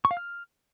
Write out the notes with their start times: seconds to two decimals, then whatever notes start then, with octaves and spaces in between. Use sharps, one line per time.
0.05 C#6
0.11 F5
0.17 F6